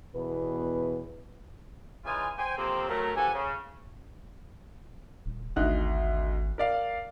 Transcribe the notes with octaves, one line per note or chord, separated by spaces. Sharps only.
E2 B2 B4
C#3 E3 G#3 D#4 F4 G#5
C5 G5 G#5
F2 C3 F3 A#3 C4
F#3 A3 A#4
G2 F3 G4 A4 F#5 G#5
C#3
D#1
G#1 D2 D#4 F#6
A#4 D5 F5